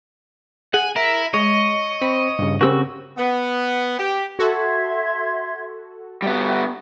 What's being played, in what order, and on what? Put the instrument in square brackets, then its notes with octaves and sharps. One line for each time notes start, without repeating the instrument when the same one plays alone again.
[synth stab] G#4 [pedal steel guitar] F#5 [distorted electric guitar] G#5
[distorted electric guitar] E4 E5 [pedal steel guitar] A#4
[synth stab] G#3 [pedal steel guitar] C#5 [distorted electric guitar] D#5
[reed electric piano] C4 [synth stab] B5
[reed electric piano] G2 C#3
[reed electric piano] C#3 [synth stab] C4 G4 A#4 [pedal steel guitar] F#4 E6
[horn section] B3
G4
[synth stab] F#4 A4 [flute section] E5 C6 G#6
[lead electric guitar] G3 B3 [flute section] F#4 E5